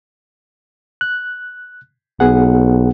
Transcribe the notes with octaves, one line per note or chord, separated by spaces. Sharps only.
F#6
B1 B3 G#4 F#5